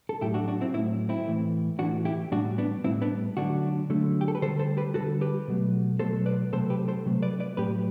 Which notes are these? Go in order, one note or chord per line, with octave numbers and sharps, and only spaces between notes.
A4
A2 F#3 A3 E4 G4
D4 F#4
D4 F#4
C4 E4
A2 F#3 A3 C4 E4
C4 E4
A2 E3 A3
A2 E3 A3 D4 F#4
E4 G4
A2 G3 D4 F#4
B3 D4
A2 G3 C4 E4
B3 D4
D3 F#3 A3 D4 F#4
D3 F#3 A3
G4
A4
B4
D3 G3 A4 C5
A4 C5
G4 B4
D3 G3 F#4 A4
G4 B4
B2 F#3 A3
B2 F#3 A3 A4 C5
B4 D5
C3 F#3 A3 A4 C5
G4 B4
A4 C5
C3 F#3 A3
B4 D5
B4 D5
A2 F#3 A3 G4 B4